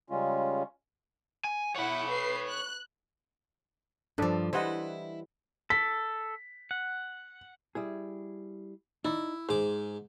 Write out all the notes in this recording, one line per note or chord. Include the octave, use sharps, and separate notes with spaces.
C#3 G3 G#3 C#4 F4
G#5
E4 C#5 F#5 B5
B4 C7
F#6
G2 F3 D4 A4 D5
E3 G3 E4 C5 D#5 F#5
A4 B6
F#5
G3 E4 G#4
D#4 E4 D5
G#2 G#4 C5 D6